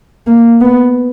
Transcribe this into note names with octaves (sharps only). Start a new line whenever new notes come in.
A#3
B3